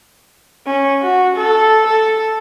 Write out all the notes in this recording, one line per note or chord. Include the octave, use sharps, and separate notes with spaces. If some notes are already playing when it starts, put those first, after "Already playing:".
C#4
F#4
A4
A4